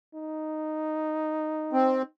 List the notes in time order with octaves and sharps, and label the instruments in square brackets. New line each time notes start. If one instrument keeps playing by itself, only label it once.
[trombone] D#4
[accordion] C4